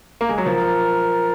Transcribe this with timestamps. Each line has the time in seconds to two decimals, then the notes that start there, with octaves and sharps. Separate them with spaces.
0.21 A#3
0.29 G#3
0.38 F#3
0.45 F3 A#4